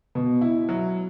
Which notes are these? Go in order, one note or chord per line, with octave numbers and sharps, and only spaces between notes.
B2
E4
F#3